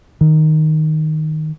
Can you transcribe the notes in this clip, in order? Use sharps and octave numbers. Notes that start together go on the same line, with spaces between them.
D#3